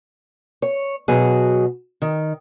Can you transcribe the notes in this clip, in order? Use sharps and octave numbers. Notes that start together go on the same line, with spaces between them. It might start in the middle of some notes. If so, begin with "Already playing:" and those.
C#5
B2 F#3 F#4 G#4
D#3